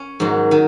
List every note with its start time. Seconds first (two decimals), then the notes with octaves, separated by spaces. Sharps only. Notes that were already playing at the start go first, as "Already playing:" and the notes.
Already playing: C#4
0.20 G#2 D#3 F#3
0.51 D#3 F#3